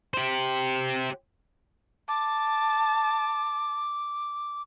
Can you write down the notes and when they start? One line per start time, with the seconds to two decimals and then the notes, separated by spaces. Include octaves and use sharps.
0.14 G4 C5
2.08 A5 D6